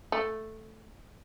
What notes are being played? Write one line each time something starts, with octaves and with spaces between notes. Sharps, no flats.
A3